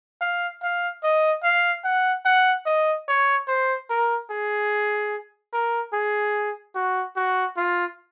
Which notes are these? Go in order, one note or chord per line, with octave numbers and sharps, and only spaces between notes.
F5
F5
D#5
F5
F#5
F#5
D#5
C#5
C5
A#4
G#4
A#4
G#4
F#4
F#4
F4